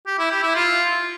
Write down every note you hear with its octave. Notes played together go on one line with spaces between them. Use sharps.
G4
E4
G4
E4
F4